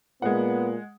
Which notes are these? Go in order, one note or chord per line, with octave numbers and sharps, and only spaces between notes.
A#2 G#3 B3 F#5